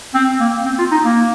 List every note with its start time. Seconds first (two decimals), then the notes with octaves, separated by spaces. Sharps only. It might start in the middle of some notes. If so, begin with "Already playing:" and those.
0.14 C4
0.40 A#3
0.65 C4
0.79 F4
0.92 D#4
1.05 A#3